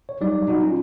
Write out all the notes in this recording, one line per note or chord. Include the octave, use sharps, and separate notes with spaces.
C#5
F#3 G3 D#4 D5
D#4 F#4
C#4 F4